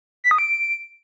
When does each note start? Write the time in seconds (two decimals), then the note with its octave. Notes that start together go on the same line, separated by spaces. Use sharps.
0.24 B6
0.31 D#6
0.38 D7